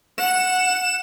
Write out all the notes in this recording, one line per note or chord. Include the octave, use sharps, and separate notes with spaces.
F#5 E7